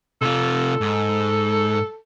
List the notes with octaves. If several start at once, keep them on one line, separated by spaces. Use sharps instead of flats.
C3 F4 A4
G#2